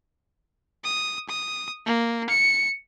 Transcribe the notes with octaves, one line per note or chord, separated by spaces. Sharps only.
D#6
D#6
A#3
C#7